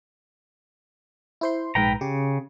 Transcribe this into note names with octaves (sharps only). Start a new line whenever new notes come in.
E4 C5 C6
A#1 G#2 B4 G5 A#5
C#3 G4